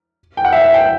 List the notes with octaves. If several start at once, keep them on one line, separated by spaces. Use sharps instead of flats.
G5
F#5
E5
E5
G5